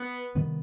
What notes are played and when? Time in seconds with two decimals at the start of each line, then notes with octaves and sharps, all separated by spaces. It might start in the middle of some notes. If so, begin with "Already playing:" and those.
Already playing: B3
0.35 C3 D#3 G3 B3